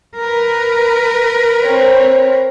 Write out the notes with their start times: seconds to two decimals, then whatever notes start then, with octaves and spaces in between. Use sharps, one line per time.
0.19 A#4 B4
1.62 C4 C#5